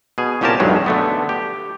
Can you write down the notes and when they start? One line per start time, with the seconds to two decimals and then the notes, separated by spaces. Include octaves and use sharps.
0.18 B2 G#4
0.41 C2 A#2 C#4 G4 A#4 A5
0.60 B1 E2 G2 F#3 G#3
0.86 D3 A3 B3
1.29 G4